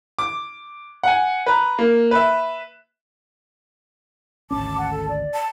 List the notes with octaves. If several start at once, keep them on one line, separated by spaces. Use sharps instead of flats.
D6
F#5 G#5
B4 A#5
A#3
B4 E5
G#1 D2 C#4 A5 D6
F#5
A4
D5
A5